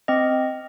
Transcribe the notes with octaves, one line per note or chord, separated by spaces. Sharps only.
C4 D#5